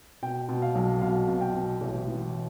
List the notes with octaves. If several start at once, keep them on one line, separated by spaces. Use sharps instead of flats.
B2 G5
B2
F5
B1
B2 F5
B2
G5
B2
A1
E3